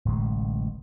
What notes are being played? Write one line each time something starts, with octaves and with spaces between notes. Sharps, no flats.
D1 A1 C3 G#3